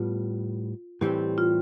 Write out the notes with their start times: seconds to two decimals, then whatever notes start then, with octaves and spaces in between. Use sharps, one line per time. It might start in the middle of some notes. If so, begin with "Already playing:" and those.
Already playing: A2 G3 B3 F4
1.01 A2 E3 G3 C4 G4
1.38 F4